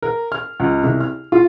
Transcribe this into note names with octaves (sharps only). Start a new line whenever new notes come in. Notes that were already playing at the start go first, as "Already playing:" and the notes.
A#4
F6
C#2
C2
F6
F4